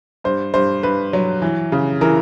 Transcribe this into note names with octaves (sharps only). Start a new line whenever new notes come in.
G2 C5
G2 C5
G2 B4
F#3
E3
C#3
E3 A#4